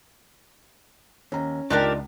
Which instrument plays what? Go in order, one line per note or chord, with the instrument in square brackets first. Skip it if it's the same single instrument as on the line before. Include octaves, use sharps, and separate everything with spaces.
[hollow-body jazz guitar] D#2 [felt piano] C#4 A#5
[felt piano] C#2 [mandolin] D4 G4 A#4 [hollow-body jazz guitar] D#4 F4 D5